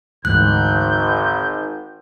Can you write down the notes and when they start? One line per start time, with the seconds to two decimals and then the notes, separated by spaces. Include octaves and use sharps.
0.25 G#1 D2 G#2 E3 F#6 G6